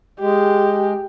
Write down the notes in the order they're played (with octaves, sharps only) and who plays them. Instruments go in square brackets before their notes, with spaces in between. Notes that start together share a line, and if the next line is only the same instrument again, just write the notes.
[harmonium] G#3 [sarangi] G4